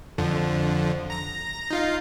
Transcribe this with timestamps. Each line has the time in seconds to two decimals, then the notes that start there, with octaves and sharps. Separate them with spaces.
0.18 F2 D3 F3
1.10 A#5 A#6
1.71 D#4 F4 F5